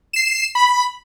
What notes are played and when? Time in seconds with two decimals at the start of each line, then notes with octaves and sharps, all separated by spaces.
0.13 C7 E7
0.55 B5